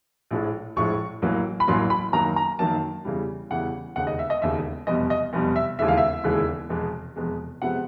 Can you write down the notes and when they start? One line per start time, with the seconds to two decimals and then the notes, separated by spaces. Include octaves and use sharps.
0.31 A#1 A2 F3 G#3
0.76 A#1 A2 F3 G#3 C#6
1.22 A1 A2 F#3 A#3
1.60 B5
1.67 A1 A2 F#3 A#3 C6
1.90 B5
2.13 F#2 D#3 F#3 A#3 A#5
2.36 A#5
2.59 F#2 D#3 F#3 A#3 A5
3.05 E2 C#3 E3 G3
3.50 E2 C#3 E3 G3 F#5
3.96 E1 D#2 C#3 F#5
4.07 D#5
4.19 E5
4.30 D#5
4.42 E1 D#2 C#3 E5
4.87 F1 E2 B2 G3 D#5
5.10 D#5
5.33 F1 E2 B2 G3
5.56 E5
5.79 E1 D#2 C#3 E3 G#3 E5
5.88 F5
5.97 E5
6.24 E1 D#2 C#3 E3 G#3
6.69 F1 E2 B2 G#3
7.16 F1 E2 B2 G#3
7.62 F2 C3 F3 G#3 B3 F#5